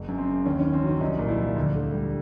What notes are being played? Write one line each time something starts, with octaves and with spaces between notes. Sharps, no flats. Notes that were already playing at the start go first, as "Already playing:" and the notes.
Already playing: F#1
F#2
C4
C#3
D#2 C#4
C#4
D#3
C4
F#3 C#4
C2 D#4
A#2
E4
F3
D2
D3
G3